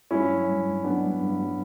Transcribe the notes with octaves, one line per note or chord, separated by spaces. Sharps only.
G2 C#4 E4
F#3
G2
G2
F#3 B3 D4
G2
G2
F#3